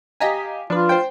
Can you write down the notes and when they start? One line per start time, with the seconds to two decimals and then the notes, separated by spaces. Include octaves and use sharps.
0.20 G4 D#5 F5 G#5 A#5 B6
0.70 F3 D4 F4 B4
0.89 C5 G5